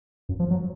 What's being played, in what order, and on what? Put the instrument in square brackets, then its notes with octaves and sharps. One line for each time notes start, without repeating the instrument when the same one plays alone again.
[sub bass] F#2
F3
F#3